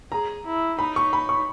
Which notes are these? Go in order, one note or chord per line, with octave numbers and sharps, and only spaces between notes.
G#4 A#5
E4
D#4 B5
C#6
B5
C#6